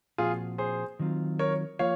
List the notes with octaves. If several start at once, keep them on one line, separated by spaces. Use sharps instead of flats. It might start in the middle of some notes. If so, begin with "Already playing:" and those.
A#2 F3 C4 F4 F#4 G#4
G#4 C5
D#3 F#3 C4 F4
A#4 C#5
F3 A#3 F4 C#5 F5